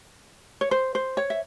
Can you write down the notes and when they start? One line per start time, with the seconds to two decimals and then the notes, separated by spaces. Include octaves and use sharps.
0.61 C#5
0.71 C5
0.95 C5
1.17 C#5
1.30 E5